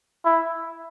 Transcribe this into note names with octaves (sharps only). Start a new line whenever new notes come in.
E4